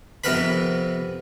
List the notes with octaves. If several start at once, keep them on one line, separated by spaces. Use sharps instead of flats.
F2 C3 B3 A#4 B4 B5